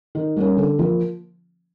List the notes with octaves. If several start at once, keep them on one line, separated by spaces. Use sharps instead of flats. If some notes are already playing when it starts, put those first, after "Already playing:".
D#3
G3 A#3 C#4
D3
F3 A#3